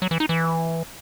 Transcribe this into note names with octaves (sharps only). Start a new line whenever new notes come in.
F#3
E3
D#4
E3